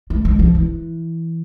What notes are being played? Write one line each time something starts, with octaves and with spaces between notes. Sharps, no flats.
A3
G#3
F3
E3